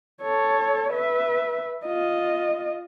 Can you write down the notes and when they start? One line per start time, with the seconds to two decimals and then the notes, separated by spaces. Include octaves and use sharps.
0.22 A4 C#5
0.92 B4 E5
1.86 F4 D#5